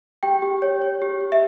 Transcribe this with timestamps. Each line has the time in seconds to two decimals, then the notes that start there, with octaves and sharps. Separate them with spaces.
0.23 G4 G5
0.42 G4
0.62 C#5
0.82 C#5
1.02 G4
1.21 G4
1.32 E5